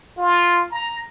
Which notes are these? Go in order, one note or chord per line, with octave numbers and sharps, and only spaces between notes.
F4
A#5